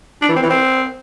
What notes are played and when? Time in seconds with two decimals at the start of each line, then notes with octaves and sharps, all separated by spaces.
0.22 D4
0.29 E3
0.36 C4
0.43 E3
0.50 C4